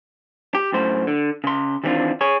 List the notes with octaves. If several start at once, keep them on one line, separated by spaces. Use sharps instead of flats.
G4
F#2 A2 C5
D3
C#3 C6
D#3 E3 G3 C4 D4 F4
G#4 C#5